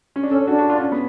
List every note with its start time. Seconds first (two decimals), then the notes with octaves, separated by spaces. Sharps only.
0.16 C#4
0.23 D4
0.31 C#4 A4
0.47 D4 F#4
0.59 F#4
0.70 F4
0.80 C#4
0.92 B3